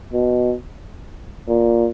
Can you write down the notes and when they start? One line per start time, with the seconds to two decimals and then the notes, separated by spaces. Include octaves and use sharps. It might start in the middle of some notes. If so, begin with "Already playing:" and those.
0.13 B2
1.48 A#2